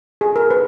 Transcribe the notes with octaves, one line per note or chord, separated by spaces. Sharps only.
G#4
A#4
B4